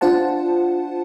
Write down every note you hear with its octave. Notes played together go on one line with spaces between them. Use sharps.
D4 F4 C5 F#5 A5